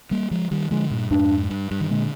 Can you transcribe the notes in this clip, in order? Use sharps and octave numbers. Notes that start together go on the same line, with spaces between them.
G3 A#3
F3 G#3
D#3 G3
D3 F3 G#3
G2 A#2
F2 G#2 D4
G2
G2
D#3
A#2 D3 G#3